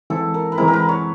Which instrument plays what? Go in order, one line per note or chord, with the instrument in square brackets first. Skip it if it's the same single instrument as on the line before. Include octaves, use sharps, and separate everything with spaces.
[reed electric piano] E3 G#3 C4 E4 [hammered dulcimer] A4
[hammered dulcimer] A#4
B4
[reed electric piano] E3 G#3 C4 E4 [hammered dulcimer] A#4
[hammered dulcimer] A#4
B4
C#5